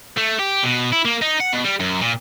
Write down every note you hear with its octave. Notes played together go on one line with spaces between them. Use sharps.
A3
G4
B2
E4
A#3
D#4
F#5
B2
G3
F#2
A#2